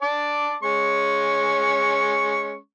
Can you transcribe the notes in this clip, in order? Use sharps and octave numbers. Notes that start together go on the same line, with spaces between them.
D5 A5 D6
G#3 C#4 C#6